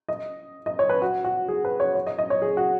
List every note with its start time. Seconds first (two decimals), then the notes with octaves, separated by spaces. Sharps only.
0.09 D#5
0.66 D#5
0.79 C#5
0.89 B4
1.02 F#4
1.24 F#4
1.48 G#4
1.65 B4
1.80 C#5
1.95 C#5
2.07 D#5
2.19 D#5
2.30 C#5
2.42 G#4
2.57 F#4